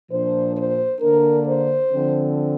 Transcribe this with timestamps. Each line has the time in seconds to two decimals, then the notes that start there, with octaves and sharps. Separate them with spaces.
0.10 A#2 F3 D4 C5
0.56 C5
1.01 D3 A#3 D4 A#4
1.47 C5
1.93 D3 F3 C4